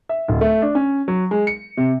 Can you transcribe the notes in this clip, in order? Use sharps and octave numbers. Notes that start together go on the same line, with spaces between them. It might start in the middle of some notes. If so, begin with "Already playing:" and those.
E5
D1
A3
D4
C#4
F#3
G#3
C#7
C3